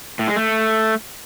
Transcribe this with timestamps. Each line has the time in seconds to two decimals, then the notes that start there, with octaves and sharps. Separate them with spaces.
0.19 A2
0.28 G#3
0.36 A3